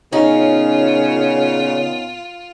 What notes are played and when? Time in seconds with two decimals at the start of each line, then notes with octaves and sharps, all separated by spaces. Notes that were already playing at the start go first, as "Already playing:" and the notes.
0.12 A#2 C#3 B3 C#4 D#4 F4